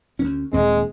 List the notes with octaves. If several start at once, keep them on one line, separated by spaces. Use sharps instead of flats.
D2 A#3 C#4
D#1 D#2 G#3 C4